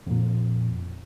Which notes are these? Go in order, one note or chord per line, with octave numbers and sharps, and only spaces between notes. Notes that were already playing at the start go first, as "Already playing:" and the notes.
F2 A#2